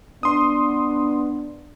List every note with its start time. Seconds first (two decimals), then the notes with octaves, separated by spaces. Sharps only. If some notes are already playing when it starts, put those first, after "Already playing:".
0.23 B3 D4 C6 D#6